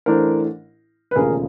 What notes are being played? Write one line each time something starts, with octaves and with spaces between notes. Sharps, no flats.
A1 A2 E3 A3 D4 A#4 C5
B4
E1 D#2 C#3 F3 A3 G#4 A#4